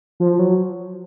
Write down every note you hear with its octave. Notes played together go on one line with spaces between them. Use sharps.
F3
F#3